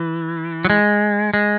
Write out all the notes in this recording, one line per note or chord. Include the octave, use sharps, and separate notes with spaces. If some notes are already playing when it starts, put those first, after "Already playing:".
Already playing: E3
F#3
G#3
G#3